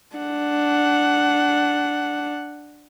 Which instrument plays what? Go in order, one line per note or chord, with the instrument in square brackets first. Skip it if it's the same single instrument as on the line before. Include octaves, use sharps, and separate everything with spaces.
[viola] D4 F#5